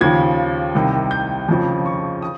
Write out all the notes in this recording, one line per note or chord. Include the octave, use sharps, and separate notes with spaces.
D#2 C#3 F3 G#6
C2 C3 D#3
G6
F2 C#3 F3
C#6
D#6